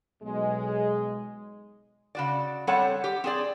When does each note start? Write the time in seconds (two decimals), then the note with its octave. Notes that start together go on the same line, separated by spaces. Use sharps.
0.23 B1 G#3
2.15 C#3 F#4 D5
2.67 G3 C4 A4 C#5 F#5
3.04 G4
3.24 C4 G#4 D5